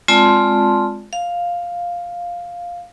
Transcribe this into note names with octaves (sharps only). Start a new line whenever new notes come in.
G#3 C4 F4 D5 A5 C6
F5